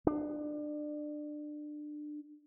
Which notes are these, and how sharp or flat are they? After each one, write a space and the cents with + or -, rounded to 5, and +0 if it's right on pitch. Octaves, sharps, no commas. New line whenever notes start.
D4 +25